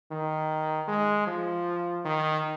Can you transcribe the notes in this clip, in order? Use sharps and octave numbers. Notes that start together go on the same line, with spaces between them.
D#3
G#3
F3
D#3